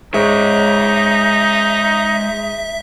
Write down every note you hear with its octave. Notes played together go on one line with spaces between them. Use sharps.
G#2 G#3 D#4 C#5 E5